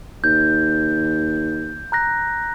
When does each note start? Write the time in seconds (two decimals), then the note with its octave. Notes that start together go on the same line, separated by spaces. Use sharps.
0.24 D#2 G6
1.92 A#5 F#6 A#6